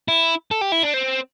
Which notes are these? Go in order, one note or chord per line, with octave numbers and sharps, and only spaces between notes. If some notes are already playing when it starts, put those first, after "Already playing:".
E4
A4
G4
E4
D4
C4